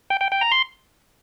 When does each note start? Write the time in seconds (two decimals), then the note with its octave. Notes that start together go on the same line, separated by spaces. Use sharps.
0.10 G5
0.21 G5
0.32 G5
0.41 A#5
0.52 C6